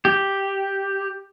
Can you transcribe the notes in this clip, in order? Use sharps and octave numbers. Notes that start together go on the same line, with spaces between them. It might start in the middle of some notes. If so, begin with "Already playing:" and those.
G4